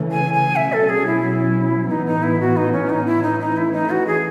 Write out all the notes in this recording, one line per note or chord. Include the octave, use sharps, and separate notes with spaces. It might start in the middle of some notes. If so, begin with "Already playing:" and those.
Already playing: C#3 E3 A3 C#4
G#5
G#5
B2 F#3 C#4 E5
A4
G#4
E4
A2 E3 B3 D#4
D#4
E4
F#4
D#4
C#4
D#4
E4
E3 A3 C#4 D#4
D#4
E4
D#4
F#4
G#4